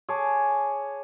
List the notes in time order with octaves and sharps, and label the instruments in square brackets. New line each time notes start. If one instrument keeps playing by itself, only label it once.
[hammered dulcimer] G#4 C#5 A5 D6